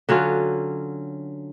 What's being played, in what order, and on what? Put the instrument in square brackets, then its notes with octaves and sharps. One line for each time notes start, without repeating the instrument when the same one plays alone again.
[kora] D3 F#3 C#4 F4